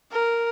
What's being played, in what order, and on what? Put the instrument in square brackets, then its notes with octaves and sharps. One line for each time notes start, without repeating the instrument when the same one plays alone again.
[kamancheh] A#4